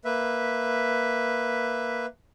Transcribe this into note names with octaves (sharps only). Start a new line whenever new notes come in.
A#3 B4 E5